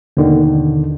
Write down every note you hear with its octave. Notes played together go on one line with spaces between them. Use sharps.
D#2 B2 D3 D#3